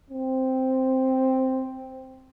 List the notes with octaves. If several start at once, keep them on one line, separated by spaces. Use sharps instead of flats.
C4